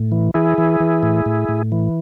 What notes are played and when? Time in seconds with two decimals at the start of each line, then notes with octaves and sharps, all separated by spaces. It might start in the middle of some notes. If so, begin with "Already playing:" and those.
Already playing: A2
0.12 E3
0.34 E3 E4 G#4
0.58 E3
0.80 E3
1.03 A2
1.26 A2
1.49 A2
1.72 E3